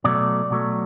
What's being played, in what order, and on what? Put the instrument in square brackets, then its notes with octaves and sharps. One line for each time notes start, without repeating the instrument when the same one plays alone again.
[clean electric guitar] B2 F#3 A3 D5
B2 F#3 A3